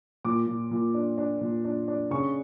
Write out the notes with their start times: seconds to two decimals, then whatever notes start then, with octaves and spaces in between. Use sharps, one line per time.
0.25 A#2 D6
0.47 A#2
0.71 A#2
0.94 D4
1.18 D4
1.41 A#2
1.65 D4
1.88 D4
2.11 C#3 C#6